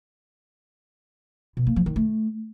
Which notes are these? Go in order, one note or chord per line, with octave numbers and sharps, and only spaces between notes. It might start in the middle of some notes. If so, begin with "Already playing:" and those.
B2
A#3
F3
D#3
A3